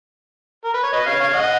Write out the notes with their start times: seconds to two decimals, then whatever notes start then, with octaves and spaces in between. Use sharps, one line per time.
0.65 A#4
0.74 B4
0.83 C#5
0.92 B4 D#5
1.06 C#5 F5
1.20 C#5 F5
1.33 D#5 F#5